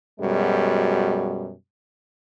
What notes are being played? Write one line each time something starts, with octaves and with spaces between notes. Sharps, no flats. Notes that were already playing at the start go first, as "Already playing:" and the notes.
F#2 B2 G3 G#3